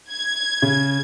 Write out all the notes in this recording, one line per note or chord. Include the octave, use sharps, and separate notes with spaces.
G#6
C#3